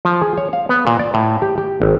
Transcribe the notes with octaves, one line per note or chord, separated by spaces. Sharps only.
F3
G#4
C#5
F5
B3
A#2
D5
A2
G4
G4
G#1